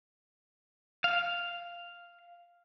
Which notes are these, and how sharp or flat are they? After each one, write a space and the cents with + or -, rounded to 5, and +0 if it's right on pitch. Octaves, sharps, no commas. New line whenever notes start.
F5 +0